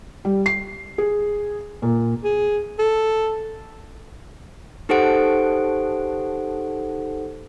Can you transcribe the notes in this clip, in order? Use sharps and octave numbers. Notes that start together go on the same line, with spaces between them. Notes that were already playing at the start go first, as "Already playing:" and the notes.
G3
C7
G#4
A#2
G#4
A4
D#4 G4 A4 C5 F#5 D7